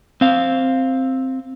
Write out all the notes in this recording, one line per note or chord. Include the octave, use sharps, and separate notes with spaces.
C4 F5